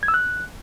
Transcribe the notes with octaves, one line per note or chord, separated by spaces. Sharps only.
G#6
E6
F#6